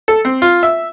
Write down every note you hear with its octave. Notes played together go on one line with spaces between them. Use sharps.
A4
C4
F4
E5